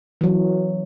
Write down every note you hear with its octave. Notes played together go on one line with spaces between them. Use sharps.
E3 F#3